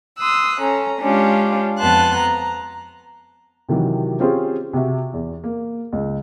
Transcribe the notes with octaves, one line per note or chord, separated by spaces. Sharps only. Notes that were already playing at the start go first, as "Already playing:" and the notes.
C6 D#6 E6 F#6
C#4 A4 A#5
G#3 C#4 D4 F4 G4
F2 B3 B4 A5 C6 F#6
A#5
C3 D#3 E3 F#3 G4
C4 C#4 F4 G4 G#4 C5
C3 F#4 E5
E2
A#3
C#2